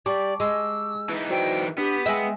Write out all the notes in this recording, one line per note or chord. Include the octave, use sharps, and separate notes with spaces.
G3 D5 A5 C#6 D6
G#3 E6
E3 D#4
F#4 C5 D5 G5
B3 D4 G4
G#3 G#4 E5 G5